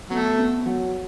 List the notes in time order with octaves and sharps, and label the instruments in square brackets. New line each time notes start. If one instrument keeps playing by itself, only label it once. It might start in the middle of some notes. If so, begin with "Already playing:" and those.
[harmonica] F#3 A3 [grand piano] B3
[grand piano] B3
F#3